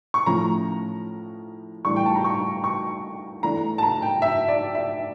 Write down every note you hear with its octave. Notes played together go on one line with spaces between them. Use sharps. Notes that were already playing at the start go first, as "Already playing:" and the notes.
C#6
A2 F3 C#4 A#5
A2 E3 G3 D4 C#6
G5
A5
A#5
C#6
C#6
E3 A3 D4 A#5
A5
A#5
G5
E5
D5
E5